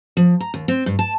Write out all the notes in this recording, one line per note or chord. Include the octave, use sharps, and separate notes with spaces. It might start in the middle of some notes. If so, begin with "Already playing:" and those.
F3
A#5
D#2
C4
G2
A5